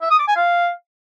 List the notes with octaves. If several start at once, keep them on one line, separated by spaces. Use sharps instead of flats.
E5
D#6
D6
G#5
F5